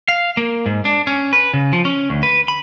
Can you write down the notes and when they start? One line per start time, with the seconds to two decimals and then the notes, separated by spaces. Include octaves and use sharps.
0.08 F5
0.37 A#3
0.66 G#2
0.85 D4
1.07 C#4
1.33 B4
1.54 C#3
1.73 F3
1.85 C#4
2.10 D2
2.23 B4
2.48 B5